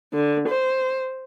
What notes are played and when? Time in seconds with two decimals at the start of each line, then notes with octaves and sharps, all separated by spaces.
0.14 D3
0.49 C5